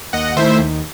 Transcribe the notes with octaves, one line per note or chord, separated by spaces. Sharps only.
D#2 D#5 F#5
D#3 A3 E4 C5 E5
D#2